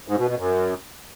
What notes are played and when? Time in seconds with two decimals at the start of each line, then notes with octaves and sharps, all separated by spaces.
0.08 G#2
0.18 B2
0.28 B2
0.38 F#2